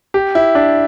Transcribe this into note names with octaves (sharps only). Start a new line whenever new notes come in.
G4
E4
D4